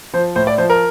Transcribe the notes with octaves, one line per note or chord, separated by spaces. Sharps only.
F3 C5
A2 C5
D5
F3 C5
A#4